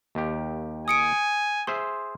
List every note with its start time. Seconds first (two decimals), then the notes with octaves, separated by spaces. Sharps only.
0.15 D#2 G4
0.88 G#5 D#6 C#7 D7
1.67 G#4 C5 E5 C6